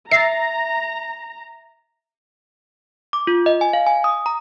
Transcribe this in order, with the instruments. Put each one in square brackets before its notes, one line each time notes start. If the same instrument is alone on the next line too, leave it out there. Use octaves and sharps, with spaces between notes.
[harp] E5 E6 A6 [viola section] A#5 [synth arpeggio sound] C7
[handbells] D6
F4
D#5
G#5
F5
G#5
D#6
A#5